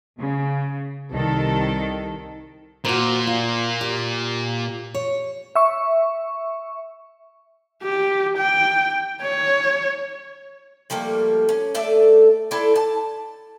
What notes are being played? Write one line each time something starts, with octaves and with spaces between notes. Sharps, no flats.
C#3
C2 D#3 A4
A#2 F#4 C5
F4
G4
C#5
E5 C#6
G4
G5
C#5
F3 G3 A3 A#3
C#4
A3 D5 E5
E4 A4 C5 D5
A5